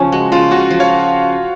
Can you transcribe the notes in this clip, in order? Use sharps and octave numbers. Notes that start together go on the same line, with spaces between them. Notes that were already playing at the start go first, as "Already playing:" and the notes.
Already playing: C#3 F3 C#4
G#3 F#4
C#3 F4
C#3 F#4
F3
C#5 F5